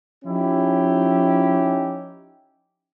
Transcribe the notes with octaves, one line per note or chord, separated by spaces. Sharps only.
F3 C#4 D#4 E4 G4